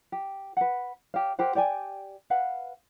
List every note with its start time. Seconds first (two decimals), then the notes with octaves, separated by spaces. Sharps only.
0.12 G4
0.57 B4 F#5
1.14 G4 C#5 F5
1.39 G4 A#4 C5 F#5
1.55 G4 D5 G5 G#5
2.30 B4 F5 F#5